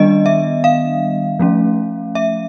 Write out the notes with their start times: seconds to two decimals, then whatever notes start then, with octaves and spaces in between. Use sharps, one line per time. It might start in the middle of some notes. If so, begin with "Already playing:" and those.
Already playing: D#3 G3 B3 D4 D#5
0.26 E5
0.64 F5
1.39 F3 A3 C#4
2.15 E5